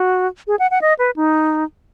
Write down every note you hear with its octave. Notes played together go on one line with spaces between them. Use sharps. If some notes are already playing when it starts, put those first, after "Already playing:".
Already playing: F#4
G#4
F#5
F#5
D#5
B4
D#4